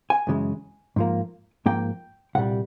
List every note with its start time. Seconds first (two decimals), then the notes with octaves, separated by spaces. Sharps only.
0.10 G#5
0.27 F#2 C#3 E3 G#3
0.96 G#2 F3 A#3
1.66 G#2 F3 A#3 G5
2.35 C2 A#2 G3 F#5